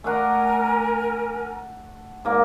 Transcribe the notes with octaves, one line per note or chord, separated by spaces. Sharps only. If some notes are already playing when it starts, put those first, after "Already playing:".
A3 D4 A#4 F#5 G#5
G#2 A#3 D5